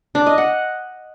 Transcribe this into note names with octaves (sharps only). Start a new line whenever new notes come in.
D4
D#5
F#5